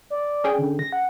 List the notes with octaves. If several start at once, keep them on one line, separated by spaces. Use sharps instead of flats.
D5
C#4 G#4 G5
D3
A#6
F#5